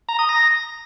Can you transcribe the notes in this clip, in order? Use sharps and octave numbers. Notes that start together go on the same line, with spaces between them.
A#5
D#6
A#6